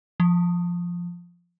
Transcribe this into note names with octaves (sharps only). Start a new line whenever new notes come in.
F3